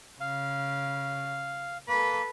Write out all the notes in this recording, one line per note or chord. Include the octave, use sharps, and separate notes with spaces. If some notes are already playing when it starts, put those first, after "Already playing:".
C#3 F5
A#3 A4 B4